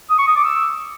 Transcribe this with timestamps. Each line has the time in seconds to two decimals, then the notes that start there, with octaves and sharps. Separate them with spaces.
0.10 D#6
0.18 C#6
0.27 D#6
0.36 D6
0.44 E6